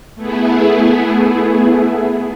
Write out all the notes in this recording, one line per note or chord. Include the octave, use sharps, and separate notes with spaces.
A3 B3 E4 G#4